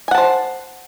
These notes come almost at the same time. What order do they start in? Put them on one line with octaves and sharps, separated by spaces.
G#5 F#5 A5 C5